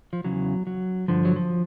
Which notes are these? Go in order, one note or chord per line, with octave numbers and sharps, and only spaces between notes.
F3
E2 C#3 E3 F#3
F#3
G2 D3 F3
F#3
F3